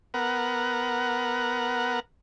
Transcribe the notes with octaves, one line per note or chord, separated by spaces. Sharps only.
B3 A#4 F#5